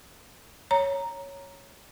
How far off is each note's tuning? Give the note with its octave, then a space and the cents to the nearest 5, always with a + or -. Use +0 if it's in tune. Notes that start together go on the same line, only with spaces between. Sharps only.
C#5 +0 A#5 +0